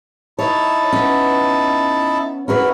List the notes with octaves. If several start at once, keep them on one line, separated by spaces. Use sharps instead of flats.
D#4 E4 C#5 A5
B3 C#4
C#4 E4 F#4 G#4 A#4 B4